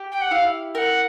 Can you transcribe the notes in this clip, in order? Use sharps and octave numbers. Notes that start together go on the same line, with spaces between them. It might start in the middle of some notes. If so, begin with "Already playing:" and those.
Already playing: G4
G5
F#5
E4 F5
A#4 F#5 G5